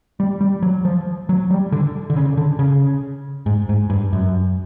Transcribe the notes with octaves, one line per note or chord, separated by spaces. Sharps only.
G3
G3
F#3
F3
F#3
G3
D3
D3
C#3
D3
C#3
G#2
G#2
G2
F#2